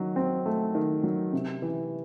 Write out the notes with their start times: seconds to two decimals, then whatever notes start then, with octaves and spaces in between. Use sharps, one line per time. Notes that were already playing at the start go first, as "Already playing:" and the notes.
Already playing: D#3 F#3
0.16 C4
0.46 A3
0.75 D#3
1.03 F#3
1.33 C3
1.62 E3